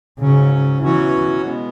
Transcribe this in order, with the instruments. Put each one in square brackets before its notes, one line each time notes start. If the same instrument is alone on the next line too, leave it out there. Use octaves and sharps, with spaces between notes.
[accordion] G#2 F#3 C#4 [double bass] C#3
[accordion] B2 F#3 C#4 F#4 C#5 [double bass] E3
[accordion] B2 G#3 B3